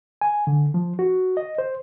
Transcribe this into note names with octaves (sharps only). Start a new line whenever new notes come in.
G#5
D3
F3
F#4
D#5
C5